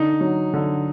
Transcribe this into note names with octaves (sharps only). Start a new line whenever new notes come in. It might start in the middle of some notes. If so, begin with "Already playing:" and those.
Already playing: D3 D#4
F#3
D3